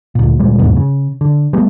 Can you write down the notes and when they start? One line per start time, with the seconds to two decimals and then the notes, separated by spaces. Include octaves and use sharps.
0.15 D2 A#2
0.39 D2 A#2 G3 G#3
0.58 F#1 D#2 G#2 B2
0.76 C#3
1.21 D3
1.53 G3 A3 B3